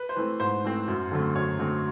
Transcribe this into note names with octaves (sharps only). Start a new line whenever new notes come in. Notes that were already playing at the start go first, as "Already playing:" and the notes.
Already playing: B4
C5
E3 A3 C4 B4
G#2 C5
E3 A3 C4
F#2
D3 F#3 A3 C4
F#2 C#5
D3 F#3 A3 C4